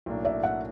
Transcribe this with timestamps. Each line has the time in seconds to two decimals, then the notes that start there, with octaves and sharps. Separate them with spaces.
0.06 B1 A2 F#3 A#3 D4
0.25 D5 E5
0.43 E5 F#5